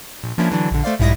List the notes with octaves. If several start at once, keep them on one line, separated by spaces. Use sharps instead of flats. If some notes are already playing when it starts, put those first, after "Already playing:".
A#1
F3 A#3 C#4 D4 E4
D3 E3 F#3 D4
A#1 D3
A3 C5 D5 F5
B1 G#2 G3 E4 D#6 A#6